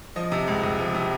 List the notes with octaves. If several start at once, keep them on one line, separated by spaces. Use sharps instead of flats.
F3 D#5
C3
C#2
C#2
F3
C3